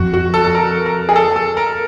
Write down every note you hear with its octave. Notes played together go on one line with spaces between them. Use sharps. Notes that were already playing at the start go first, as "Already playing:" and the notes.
Already playing: F2 F#4
F#4
A4
A4
A#4
A#4
G#4
A4
A4
A#4